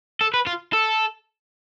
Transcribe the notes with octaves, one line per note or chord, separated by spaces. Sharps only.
A4
B4
F4
A4